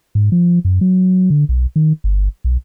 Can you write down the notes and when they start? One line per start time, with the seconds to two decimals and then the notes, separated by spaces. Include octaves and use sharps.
0.15 G#2
0.32 F3
0.65 F#2
0.81 F#3
1.30 D3
1.49 B1
1.76 D#3
2.04 G1
2.44 B1